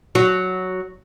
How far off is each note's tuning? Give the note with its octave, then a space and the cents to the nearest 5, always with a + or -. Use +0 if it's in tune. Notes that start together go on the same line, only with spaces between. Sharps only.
F#3 +0 F#4 +0